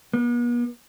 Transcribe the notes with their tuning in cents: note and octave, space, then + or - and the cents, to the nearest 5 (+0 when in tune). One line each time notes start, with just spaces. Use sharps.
B3 -45